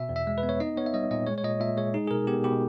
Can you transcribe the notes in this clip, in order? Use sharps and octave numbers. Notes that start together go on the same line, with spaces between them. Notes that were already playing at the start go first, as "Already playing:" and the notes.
Already playing: B2 E5
E2
E5
G#3
B4
B3
C#5
D#4 D#5
B3 C#5
E5
G3 D#5
A#2 D#5
G#3 C#5
C#5
A#2 D#5
A#2 E5
G#3 C#5
D#4 G#4
G#4
B2 A#4
B3 G4
B2 G4